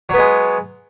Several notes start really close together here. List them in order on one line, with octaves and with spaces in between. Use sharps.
F#3 B3 G#3